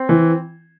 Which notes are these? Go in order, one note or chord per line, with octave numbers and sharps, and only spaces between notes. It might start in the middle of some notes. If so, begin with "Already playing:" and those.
Already playing: C4
E3